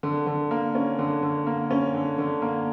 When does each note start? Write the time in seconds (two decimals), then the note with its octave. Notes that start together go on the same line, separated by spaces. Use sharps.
0.03 D3
0.27 D3
0.51 A#3
0.75 C#4
0.99 D3
1.23 D3
1.47 A#3
1.71 C#4
1.94 D3
2.18 D3
2.42 A#3